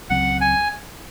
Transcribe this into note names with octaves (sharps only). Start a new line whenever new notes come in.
C#2 C#3 F#3 C4 F#5
G#5